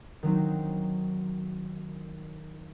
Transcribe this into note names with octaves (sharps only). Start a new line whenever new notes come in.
D#3 F#3 C4 D#4